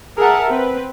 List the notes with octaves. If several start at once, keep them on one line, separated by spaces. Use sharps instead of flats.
G#4 A#4 E5 F#5 A5
C4 B4